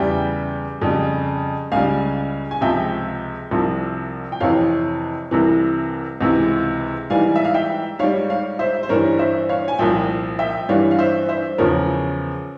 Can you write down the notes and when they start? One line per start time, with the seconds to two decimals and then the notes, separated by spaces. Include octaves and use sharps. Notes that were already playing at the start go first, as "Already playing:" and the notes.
Already playing: E2 C#3 G3 E5 G5
0.82 F2 C#3 G3
1.72 C#2 C#3 G3 F5 G#5
2.51 G#5
2.61 C#2 C3 F3 E5 G5
3.51 C2 C3 F3
4.32 G5
4.40 F2 C3 E3 C#5 F5
5.31 C2 C3 E3
6.21 C#2 C3 E3
7.10 G#2 E3 G3 F5 G#5
7.36 E5
7.45 F5
7.54 E5 G5
7.99 G#2 G3 C#5 F5
8.29 C#5 F5
8.59 C5 E5
8.83 C5
8.89 G2 E3 G3 A#4 C#5
9.19 C5 E5
9.49 C#5 F5
9.68 G#5
9.79 C2 A#2 F3 E5 G5
10.39 E5 G5
10.69 G2 E3 G3 C#5 F5
10.91 F5
10.99 C5 E5
11.29 C5 E5
11.58 E2 C#3 F3 A#4 C#5